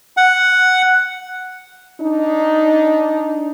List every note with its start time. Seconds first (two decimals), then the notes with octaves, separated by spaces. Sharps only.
0.17 F#5
2.01 D4 D#4